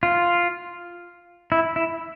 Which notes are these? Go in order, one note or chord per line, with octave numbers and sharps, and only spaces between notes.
F4
E4
E4